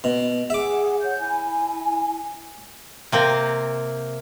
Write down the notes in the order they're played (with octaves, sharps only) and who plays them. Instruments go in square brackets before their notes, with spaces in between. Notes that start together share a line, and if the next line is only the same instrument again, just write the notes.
[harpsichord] B2
[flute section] G#4 F#5 [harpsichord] E5 D6
[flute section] C#5 F#5 G6
E4 G#5
[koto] C3 A#3 C4